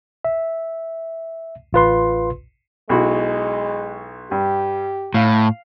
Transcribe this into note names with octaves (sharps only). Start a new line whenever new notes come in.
E5
A1 F4 B4 C6
B1 G#3 E4 F#4
G2 G4
A2 F5